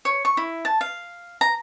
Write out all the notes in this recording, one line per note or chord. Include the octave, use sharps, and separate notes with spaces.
C#5
C#6
E4
A5
F5
A#5